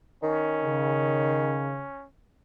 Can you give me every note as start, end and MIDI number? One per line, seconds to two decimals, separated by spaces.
0.23 1.78 51
0.23 2.06 61
0.63 1.85 49